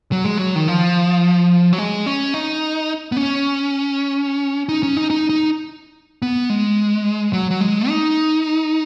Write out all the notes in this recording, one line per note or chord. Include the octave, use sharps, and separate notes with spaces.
F#3
G#3
F#3
D#3
F3
F#3
G#3
C#4
D#4
B3
C#4
D#4
C#4
D#4
D#4
D#4
B3
G#3
F#3
F#3
G#3
D#4